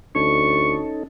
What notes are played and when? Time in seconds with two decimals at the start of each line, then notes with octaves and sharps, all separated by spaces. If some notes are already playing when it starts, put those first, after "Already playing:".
0.15 D2 C#4 D#4 A4 C#6